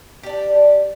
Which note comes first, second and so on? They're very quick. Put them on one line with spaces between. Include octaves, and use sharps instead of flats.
G4 D5 D4